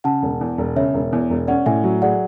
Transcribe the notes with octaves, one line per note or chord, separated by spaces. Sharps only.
C#3 F#5 A5
E1
E2
E1
C#3 C#5 E5
E1
E2
E1
C#4 D5 F#5
A2 E5 G#5
F#3
G#4 D5 F#5